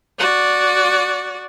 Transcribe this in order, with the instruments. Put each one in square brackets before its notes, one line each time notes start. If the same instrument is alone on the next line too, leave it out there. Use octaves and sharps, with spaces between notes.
[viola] F#4 D5